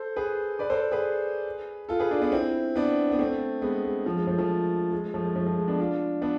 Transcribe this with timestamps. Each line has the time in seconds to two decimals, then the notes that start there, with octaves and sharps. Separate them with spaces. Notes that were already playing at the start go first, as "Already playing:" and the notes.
Already playing: A4 C5
0.16 G#4 B4
0.59 B4 D5
0.70 A4 C5
0.92 G#4 B4
1.89 F4 A4
2.00 G#4 B4
2.11 D4 F4
2.21 B3 D4
2.32 C4 E4
2.75 B3 D4
3.11 B3
3.19 A3 C4
3.62 G#3 B3
3.85 G#3
4.06 F3
4.16 G#3
4.27 F3 A3
4.38 F3 A3
4.92 G#3
5.14 F3 A3
5.25 G#3
5.36 F3 A3
5.46 F3
5.57 G#3
5.67 B3 D4
5.79 D4 F4
6.22 B3 D4